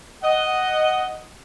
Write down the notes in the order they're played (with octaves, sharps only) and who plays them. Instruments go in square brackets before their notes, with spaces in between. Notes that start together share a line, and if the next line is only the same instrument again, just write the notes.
[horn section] D#5 F#5